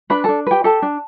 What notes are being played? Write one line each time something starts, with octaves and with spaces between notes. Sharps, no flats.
D4 B4 B5
D4 A4 A5
G4 B4 G5
G4 A4 A5
D4